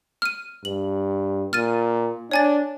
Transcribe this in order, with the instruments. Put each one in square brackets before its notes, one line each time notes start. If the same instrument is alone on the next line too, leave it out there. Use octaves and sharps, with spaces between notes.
[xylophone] F6 D#7
[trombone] G2 [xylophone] F#7
[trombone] A#2 [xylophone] F6 A6 D#7
[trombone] D4 [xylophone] C#5 G#5 A6